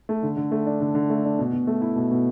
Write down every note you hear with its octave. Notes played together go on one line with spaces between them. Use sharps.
A3
D3
D3
A3
D4
D3
D3
A3
D4
B2
B2
A3
E4
B2
B2